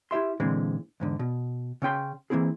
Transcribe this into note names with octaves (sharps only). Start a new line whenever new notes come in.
E4 G4 E5 C6
A#2 D3 E3 G#3 C4
E2 G#2 D3
B2
C#3 C#4 G5 C6
E3 A3 A#3 C4 E4 G#4